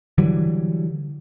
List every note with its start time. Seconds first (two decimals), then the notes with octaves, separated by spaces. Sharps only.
0.18 D3 E3 F#3 G3